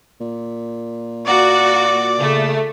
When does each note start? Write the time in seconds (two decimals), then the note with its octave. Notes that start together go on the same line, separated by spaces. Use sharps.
0.20 A#2
1.26 A#3 F#4 D5
2.19 C#3 A3